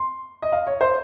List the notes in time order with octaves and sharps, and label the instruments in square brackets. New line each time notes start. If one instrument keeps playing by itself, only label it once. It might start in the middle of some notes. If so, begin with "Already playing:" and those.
Already playing: [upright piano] C6
D#5
F5
C#5
C5